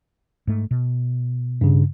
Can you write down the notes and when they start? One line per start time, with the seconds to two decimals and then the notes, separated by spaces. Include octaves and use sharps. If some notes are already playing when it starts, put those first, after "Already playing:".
0.47 G#2 A3
0.71 B2
1.61 G2 C#3